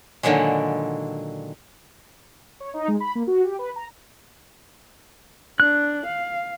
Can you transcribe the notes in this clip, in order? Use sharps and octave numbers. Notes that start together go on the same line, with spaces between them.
A#2 D3 D#3 F#3 G#3
C#5
D#4
G#3
B5
A#3
F#4
G4
B4
A#5
D4 F#6
F5